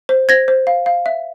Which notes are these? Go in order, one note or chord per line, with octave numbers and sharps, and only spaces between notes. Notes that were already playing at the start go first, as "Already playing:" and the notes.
C5
C5 G#6 A#6
C5
F5
F5
E5